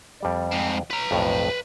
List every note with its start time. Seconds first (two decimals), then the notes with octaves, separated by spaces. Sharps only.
0.20 F2 G3 D5
0.51 G#2 C4
0.90 B4 A#5
1.11 B1 F2 A2